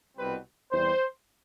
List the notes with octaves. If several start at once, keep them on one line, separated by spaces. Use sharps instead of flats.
C2 B2 G3 C4 B4
E2 C3 G3 C4 C5